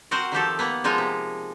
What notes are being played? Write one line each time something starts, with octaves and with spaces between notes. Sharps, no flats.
C4 F#4 A#4 C5
D#3 F3 G4 A4
A#3 B3
F3 G#3 D#4 F4
C3